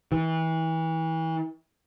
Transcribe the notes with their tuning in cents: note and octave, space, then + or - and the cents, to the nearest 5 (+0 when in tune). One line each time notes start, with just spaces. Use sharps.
E3 -30